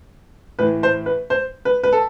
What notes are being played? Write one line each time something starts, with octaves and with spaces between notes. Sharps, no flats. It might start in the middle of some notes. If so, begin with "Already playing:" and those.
A2 E3 B4
C5
B4
C5
B4
B4
A4